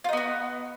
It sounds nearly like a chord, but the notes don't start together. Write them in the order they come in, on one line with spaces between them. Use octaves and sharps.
F4 D#4 B3 F#4